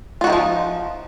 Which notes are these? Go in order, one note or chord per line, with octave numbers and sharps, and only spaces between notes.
D#3 F3 D#4 F4 F#4